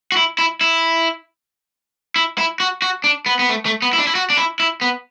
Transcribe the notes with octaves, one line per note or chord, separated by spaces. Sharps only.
F#4
E4
E4
E4
E4
E4
F#4
F#4
D4
B3
B3
A3
A3
B3
E4
D4
E4
F#4
D4
E4
E4
B3